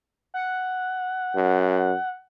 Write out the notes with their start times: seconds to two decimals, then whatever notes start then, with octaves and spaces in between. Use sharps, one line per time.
0.34 F#5
1.35 F#2